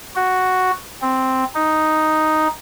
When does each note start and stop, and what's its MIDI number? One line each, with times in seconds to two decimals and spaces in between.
0.16 0.71 66
1.02 1.44 60
1.55 2.48 63